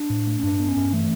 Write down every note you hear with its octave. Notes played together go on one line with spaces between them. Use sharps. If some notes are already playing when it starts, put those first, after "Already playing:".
Already playing: D4
A2
A3
C#4
G2 D4
B3
C#4
G2
E3 A3